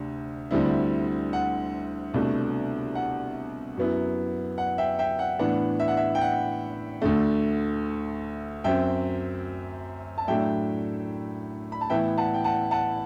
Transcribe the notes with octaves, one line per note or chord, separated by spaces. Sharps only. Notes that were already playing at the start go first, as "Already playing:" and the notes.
Already playing: D2 C3 D4
D2 D3 G3 C4 E4
F#5
C2 B2 A3 D4
F#5
F#2 F#3 B3 E4
F#5
E5 G5
E5 G5
F#5
A2 E3 B3 D4 F#5
E5
F#5
E5
G5
F#5
D2 D3 A3
F#2 F#3 C4 E5 G5
A5
A2 F#3 A3 D4 E5 G5
B5
A5
A2 E3 B3 E4 E5 G5
F#5 A5
G5
F#5 A5
F#5 A5